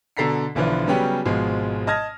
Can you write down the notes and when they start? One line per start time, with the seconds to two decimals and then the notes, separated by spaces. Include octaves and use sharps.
0.17 B2 D3 A4 A#5 B6 C7
0.55 B1 D3 E3 F3 B4
0.87 C#3 F#3 G3 B3 C#4 G4
1.25 G#1 B2 F3 G#3
1.87 D#5 A5 D#6 F6 G#6 A#6